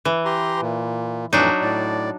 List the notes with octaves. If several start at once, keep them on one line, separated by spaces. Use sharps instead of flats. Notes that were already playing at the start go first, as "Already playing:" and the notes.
E3
G4 A#5 C6
A#2
F2 A2 E3 F#3 D4 D#4
A2 D5